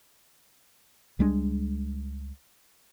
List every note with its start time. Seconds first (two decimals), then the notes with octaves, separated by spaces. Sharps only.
1.19 C#2 G3 G#3 D4